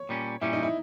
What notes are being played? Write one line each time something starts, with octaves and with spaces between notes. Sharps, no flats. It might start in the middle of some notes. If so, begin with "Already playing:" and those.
Already playing: C#5
A#2 G3 C#4
A#2 G3 C#4 E4
D#4
E4